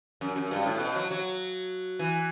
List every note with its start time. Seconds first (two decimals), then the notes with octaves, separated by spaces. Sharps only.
0.21 F#2
0.36 F#2
0.51 G2
0.66 A2
0.80 B2
0.96 F#3
1.11 F#3
1.99 E3